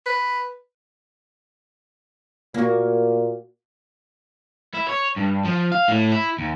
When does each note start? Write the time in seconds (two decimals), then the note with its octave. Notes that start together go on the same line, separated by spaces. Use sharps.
0.06 B4
2.54 A#2 A#3 F#4
4.74 E4
4.88 C#5
5.16 G2
5.44 F3
5.72 F5
5.88 A2
6.12 E4
6.39 D#2